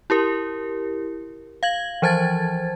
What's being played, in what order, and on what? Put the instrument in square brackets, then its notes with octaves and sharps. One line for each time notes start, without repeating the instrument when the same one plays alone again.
[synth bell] E4 G4 A#4
F5 G#6 F#7
E3 F3 C5 A5 G#6 A6